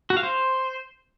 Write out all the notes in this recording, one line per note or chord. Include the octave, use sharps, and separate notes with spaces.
F#4
F5
C5